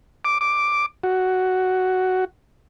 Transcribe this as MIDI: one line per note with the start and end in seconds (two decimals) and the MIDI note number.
0.25 0.38 86
0.41 0.86 86
1.04 2.25 66